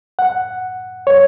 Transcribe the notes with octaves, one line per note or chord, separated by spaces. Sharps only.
F#5
C#5